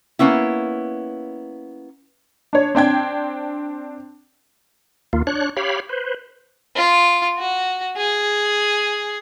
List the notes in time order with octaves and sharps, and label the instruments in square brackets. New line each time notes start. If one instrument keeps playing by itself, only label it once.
[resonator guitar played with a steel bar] A#3 B3 C#4 E4
[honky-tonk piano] D4 C#5
C4 D4 G5 G#6
[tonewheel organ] D#2 A#3 F4
D4 C#5 F#6
G4 C#5 F5 B5
B4 C5
[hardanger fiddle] F4
F#4
G#4